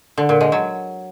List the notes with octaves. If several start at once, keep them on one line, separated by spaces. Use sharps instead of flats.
D3
A#2
G#3
F#3